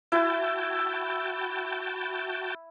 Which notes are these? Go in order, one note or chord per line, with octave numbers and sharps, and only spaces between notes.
E4 F#4 G5 A5